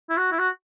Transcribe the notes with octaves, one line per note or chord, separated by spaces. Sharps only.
E4
F#4
E4
F#4